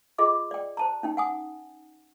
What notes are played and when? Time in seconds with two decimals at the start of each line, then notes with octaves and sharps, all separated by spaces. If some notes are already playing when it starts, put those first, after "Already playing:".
0.18 F4 G#4 D#5 D6
0.51 D5 G5
0.77 C5 A5 A#5
1.03 C#4 D#4 G5
1.17 F#5 G#5 D#6